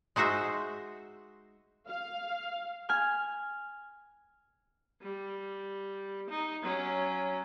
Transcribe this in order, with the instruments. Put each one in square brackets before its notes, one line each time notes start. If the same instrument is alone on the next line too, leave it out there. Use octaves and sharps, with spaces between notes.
[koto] G#3 D#4 F#4 C5 E5
[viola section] F5
[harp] G#5 F6
[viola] G3
D#4
F#3 C#4